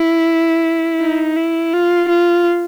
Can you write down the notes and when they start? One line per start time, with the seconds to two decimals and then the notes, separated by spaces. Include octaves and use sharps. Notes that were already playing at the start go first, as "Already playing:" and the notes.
Already playing: E4
1.01 D#4
1.36 E4
1.73 F4
2.09 F4